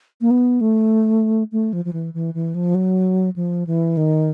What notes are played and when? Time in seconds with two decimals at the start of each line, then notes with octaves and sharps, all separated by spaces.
0.21 A#3
0.31 B3
0.61 A3
1.52 A3
1.73 F3
1.85 F3
1.93 E3
2.14 E3
2.34 E3
2.54 F3
2.75 F#3
3.36 F3
3.67 E3
3.97 D#3